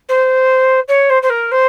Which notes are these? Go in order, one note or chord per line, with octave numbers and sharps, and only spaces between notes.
C5
C#5
C5
C5
A#4
C5